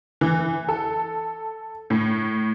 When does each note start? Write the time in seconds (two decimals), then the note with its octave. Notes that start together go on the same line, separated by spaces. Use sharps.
0.21 E3
0.68 A4
1.90 A2